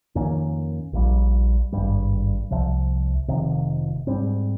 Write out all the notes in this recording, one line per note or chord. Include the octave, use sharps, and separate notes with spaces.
F2 D#3 A#3 C#4
A#1 A#2 G3
G#1 G2 G3
C2 C3 F3
F1 F2 C3 D#3
G#2 G3 C4